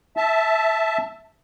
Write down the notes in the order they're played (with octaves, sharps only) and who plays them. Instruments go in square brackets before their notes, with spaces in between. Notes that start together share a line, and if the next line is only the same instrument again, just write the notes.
[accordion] E5 A5